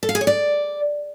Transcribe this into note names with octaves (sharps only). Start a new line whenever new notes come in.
A4
F5
G#4
C#5
D5